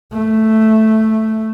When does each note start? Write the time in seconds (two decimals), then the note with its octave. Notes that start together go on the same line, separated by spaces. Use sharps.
0.13 A3